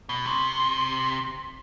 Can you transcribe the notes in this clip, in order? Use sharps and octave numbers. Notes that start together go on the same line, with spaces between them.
B2
C3